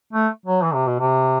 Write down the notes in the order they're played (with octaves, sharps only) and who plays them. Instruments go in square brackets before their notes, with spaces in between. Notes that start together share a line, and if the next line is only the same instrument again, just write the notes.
[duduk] A3
F#3
E3
C3
B2
C3